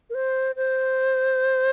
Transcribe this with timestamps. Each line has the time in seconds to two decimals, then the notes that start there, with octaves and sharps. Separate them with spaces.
0.10 A#4
0.14 C5
0.56 C5